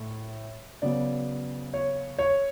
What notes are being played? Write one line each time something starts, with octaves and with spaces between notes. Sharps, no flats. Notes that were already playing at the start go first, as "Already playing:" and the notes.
Already playing: A2
C#3 F#3 B3 D5
C#5
C#5